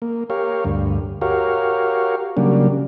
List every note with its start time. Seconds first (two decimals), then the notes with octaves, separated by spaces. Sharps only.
0.02 A#3
0.30 G4 A#4 C#5 F5
0.65 D2 G2
1.21 F#4 G4 A#4 C#5 F5
2.37 C#3 F#3 G3 A#3 D4